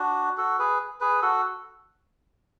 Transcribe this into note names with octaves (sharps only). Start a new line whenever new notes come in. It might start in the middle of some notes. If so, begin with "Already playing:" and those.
Already playing: D4 F#4
F#4 A4
G#4 B4
G#4 B4
F#4 A4